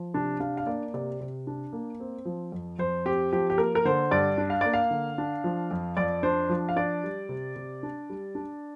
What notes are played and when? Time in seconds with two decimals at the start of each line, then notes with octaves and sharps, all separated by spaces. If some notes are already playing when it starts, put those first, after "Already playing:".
Already playing: F3
0.14 C3 D4
0.40 D4 F5
0.57 F5
0.66 A#3 D5
0.94 C3 D5
1.21 C3
1.47 D4
1.73 A#3
2.00 C4
2.25 F3
2.52 F2
2.79 F2 C5
3.05 C4 G4
3.33 F3 G4
3.50 G4
3.58 A#3 A#4
3.75 A#4
3.85 D3 C5
4.11 G2 D5
4.38 D4
4.50 F5
4.61 A#3 D5
4.73 F5
4.91 D3
5.18 D4
5.44 F3
5.71 F2
5.97 F2 D5
6.23 D4 C5
6.49 F3
6.69 F5
6.76 D4 D5
7.04 G3
7.29 C3
7.56 C3
7.83 D4
8.10 G3
8.35 D4